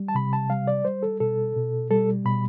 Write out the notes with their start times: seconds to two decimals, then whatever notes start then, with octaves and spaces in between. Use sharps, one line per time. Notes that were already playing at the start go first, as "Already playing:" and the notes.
Already playing: G3
0.08 A5
0.15 C3 B5
0.33 A5
0.50 G3 F5
0.68 D5
0.85 G3 C5
1.03 A4
1.20 B2 A4
1.56 B2
1.90 G3 A4
2.25 B2 B5